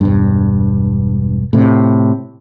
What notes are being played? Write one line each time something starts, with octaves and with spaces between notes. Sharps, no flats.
E1 G2
A2 C3